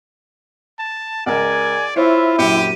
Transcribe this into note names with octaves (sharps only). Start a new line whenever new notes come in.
A5
C#2 A#4 D5 G#5
E4 F4 C5 C#5 E5
A#1 F#2 G4 C#7 D#7